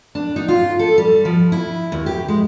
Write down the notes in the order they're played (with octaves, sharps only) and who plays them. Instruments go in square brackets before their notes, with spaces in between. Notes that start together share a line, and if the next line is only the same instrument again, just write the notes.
[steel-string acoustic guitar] D4
D#4
F4
A4
G3
F3
E4
D#2
G4
G#3